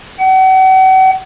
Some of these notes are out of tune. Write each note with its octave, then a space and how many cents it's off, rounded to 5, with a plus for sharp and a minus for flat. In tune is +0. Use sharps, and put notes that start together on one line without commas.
F#5 +40